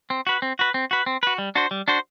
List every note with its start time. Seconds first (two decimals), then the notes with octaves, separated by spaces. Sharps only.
0.10 C4
0.27 F#4 B4
0.42 C4
0.59 F#4 B4
0.74 C4
0.91 F#4 B4
1.06 C4
1.23 F#4 B4
1.38 G3
1.55 D4 F#4 C5
1.71 G3
1.88 D4 F#4 C5